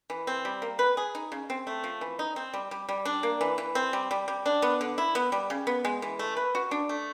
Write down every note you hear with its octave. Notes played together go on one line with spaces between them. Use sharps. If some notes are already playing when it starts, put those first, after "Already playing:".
E3
C4
G3
A#3
B4
G#4
D#4
C#3
C4
A3
F3
E3
D#4
C4
G3
G3
G3
D4
A#3
E3
E3
C4
G3
G3
G3
D4
B3
D3
E4
B3
G3
C#3
B3
G#3
E3
A3
B4
F#4
D4
A3